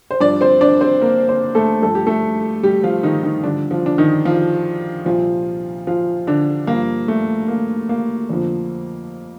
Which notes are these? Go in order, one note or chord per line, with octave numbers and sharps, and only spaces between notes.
C5
G2 F3 D4 D5
C4 C5
D4 D5
C4 C5
A#3 A#4
C4 C5
A3 A4
G2 F3 A4
G4
A3 A4
G3 G4
F3 F4
D#3 D#4
D#3 D#4
G2 D3 F3 D4
F3 F4
D4
D#3 D#4
F3 F4
C2 A#2 F3 F4
F3 F4
D3 D4
G2 F3 A#3
A3
A#3
A#3
F2 D3 F3